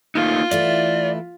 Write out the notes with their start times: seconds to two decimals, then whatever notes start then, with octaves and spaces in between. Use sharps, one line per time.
0.15 A3 A#3 D#4 F4
0.51 E3 A3 E4 D5